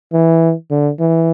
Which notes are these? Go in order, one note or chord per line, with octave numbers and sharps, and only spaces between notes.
E3
D3
E3